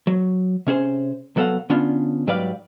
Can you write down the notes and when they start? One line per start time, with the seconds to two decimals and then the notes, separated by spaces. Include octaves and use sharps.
0.07 F#3
0.67 C3 C#4 G#4 C5
1.36 C2 F#3 B3 A4 F5 F#5
1.70 D3 B3 C#4 D4 F4
2.27 G#2 F#3 G3 B4 D5 F5